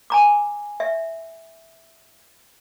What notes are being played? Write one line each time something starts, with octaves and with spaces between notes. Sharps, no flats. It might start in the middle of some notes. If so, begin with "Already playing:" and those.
G#5 A#5 D6
E5